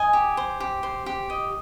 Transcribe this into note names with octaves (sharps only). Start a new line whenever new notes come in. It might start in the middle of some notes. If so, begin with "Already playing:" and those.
Already playing: D#5 G#5
G4
C5
G4
C5
G4
D#5